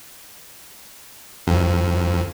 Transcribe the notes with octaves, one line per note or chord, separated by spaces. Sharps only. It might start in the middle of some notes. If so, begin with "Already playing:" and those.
F2